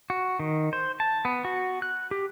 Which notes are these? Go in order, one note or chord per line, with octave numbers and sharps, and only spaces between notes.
F#4
D#3
C5
A5
B3
F#4
F#6
G4